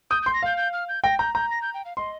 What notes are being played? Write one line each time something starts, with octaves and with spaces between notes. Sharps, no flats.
D#6 G6
G6
C6
A#6
F5 G6
G6
F6
G6
G5 A#6
A#5 G6
A#5 G6
A#6
G6
G5
F5
D#5 C6